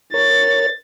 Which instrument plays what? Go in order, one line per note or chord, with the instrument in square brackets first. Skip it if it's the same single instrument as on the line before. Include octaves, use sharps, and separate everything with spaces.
[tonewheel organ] A#4 C#5 [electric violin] A6